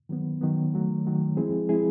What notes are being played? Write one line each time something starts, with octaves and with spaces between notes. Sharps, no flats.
D#3 F#3 B3
D#3 F#3 B3
D#3 F#3 A3
D#3 F#3 A3
F3 G#3 C4 E4 G#4
F3 G#3 C4 E4 G#4